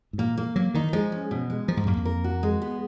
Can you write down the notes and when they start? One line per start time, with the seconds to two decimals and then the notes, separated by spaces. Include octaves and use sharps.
0.13 G#2
0.18 A#2 A#3
0.38 A#3
0.56 F#3 A#3
0.74 D#3 D#4
0.93 F3 G#3
1.12 C#4
1.31 B2
1.50 G#3
1.68 F3 A#4
1.77 G#2
1.87 F#2 A#3
1.97 F2
2.05 A#4
2.24 F#4
2.43 G#3
2.62 B3